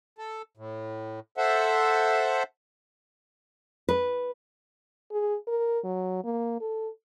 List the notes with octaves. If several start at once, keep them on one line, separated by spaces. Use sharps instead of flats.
A4
A2
A4 C5 E5 F#5
B4
G#4
A#4
F#3
A#3
A4